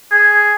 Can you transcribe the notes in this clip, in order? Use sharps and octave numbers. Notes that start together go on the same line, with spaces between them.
G#4